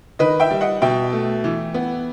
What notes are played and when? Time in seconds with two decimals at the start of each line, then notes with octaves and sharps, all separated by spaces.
0.19 D#3 B4 D#5
0.40 E5 G5
0.51 G3
0.61 D#5 F#5
0.82 B2 E5 G5
1.13 A3
1.44 E3
1.74 B3